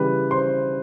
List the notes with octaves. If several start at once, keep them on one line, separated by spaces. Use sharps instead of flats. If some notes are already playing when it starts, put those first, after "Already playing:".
Already playing: C#3 E3 G3 B4
C5 C6